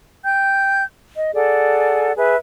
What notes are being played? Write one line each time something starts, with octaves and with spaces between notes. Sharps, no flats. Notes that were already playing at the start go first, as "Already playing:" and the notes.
G5 G6
D#5
G#4 A4 D5 F#5
G#4 B4 E5